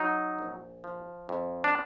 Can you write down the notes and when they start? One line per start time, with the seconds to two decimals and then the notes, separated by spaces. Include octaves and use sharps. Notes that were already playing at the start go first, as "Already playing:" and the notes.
Already playing: F#3 D#4
0.39 A#1
0.84 F3
1.29 F2
1.64 D4